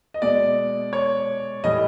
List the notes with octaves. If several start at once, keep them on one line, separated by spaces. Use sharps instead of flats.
D#5
B2 G#3 D5
C#5
A2 E3 G3 D#5